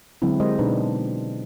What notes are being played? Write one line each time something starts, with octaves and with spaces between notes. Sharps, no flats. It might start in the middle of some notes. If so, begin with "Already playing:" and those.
D3 F#3 G#3 C4 E4
G#3 G4 A#4 C5 D#5
B2 D4 D#4 B4